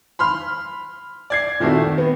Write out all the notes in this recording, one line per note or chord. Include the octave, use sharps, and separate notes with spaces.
B5 C6 F6
D5 G#6 C7
A#2 D#3 A3 C4 E4 F#4
D#3
B3